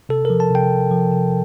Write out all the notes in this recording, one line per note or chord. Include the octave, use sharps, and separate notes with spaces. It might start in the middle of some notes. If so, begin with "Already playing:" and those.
C3 A4
F3 A#4
A5
C3 G5
C3
F3
C3